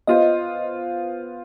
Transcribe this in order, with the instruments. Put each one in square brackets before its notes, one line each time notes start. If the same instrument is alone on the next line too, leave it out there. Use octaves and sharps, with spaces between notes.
[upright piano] B3 F4 C5 [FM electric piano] D#5